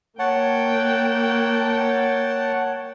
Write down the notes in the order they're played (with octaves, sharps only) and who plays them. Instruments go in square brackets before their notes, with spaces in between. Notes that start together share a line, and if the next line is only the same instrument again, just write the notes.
[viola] A#3 G5 [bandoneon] C#5 F#5 A5